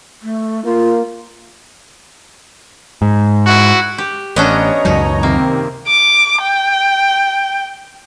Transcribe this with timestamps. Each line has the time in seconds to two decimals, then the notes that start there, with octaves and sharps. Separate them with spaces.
0.23 A3
0.65 A#3 F4
3.02 G#2
3.47 E4 F#4
3.98 G4
4.36 A1 B3 C#4 D4 C#5 D#5 A#5
4.85 C#2 F#2 B2 F#3 D#4
5.23 C3 D#3 A#3 C4
5.88 D6
6.42 G5